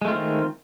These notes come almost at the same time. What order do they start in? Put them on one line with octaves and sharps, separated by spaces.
G#3 A3 F4 C4 D#3